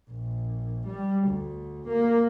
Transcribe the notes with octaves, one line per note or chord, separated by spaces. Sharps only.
A#1
G3
D2
A#3